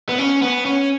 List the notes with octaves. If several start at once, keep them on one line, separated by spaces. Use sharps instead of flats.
B3
C#4
B3
C#4